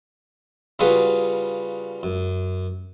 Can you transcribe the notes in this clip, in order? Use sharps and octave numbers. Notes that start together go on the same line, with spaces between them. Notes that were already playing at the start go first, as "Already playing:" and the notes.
C#3 G3 F4 F#4 G#4 B4
F#2